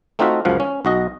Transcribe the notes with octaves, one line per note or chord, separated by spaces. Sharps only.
A3 C4 D#4 F4 F#4 E5
C#2 F#2 F3 F5 F#5
C#4
B1 F#4 D#5